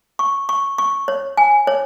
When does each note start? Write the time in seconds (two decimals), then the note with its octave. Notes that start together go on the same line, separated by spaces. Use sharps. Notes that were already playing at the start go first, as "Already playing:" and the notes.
0.19 C#6
0.49 C#6
0.78 C#6
1.08 C#5
1.37 G#5
1.67 C#5